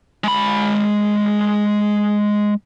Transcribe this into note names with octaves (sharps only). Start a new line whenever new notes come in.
G#3 B5